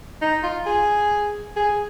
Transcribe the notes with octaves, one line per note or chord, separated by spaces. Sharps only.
D#4
F4
G#4
G#4